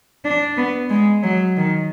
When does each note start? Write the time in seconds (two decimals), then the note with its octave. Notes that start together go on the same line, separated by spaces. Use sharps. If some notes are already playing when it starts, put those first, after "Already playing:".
0.25 D4
0.57 B3
0.90 G#3
1.23 F#3
1.57 D#3